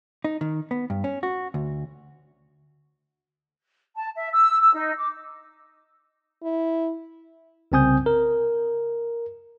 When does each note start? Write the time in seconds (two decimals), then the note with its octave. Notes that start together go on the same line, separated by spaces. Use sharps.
0.24 D#4
0.41 D#3
0.71 B3
0.90 G2
1.04 C#4
1.23 F#4
1.54 D2
3.95 A5
4.15 E5
4.33 E6
4.59 E6
4.74 D#4
4.97 D6
6.43 E4
7.72 C2 C#3 C4 G#5 D#6 G6
8.06 A#4